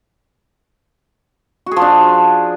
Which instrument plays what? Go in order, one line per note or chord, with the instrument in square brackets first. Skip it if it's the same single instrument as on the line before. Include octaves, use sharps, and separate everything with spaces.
[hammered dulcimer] F#4
G#4
F3
D4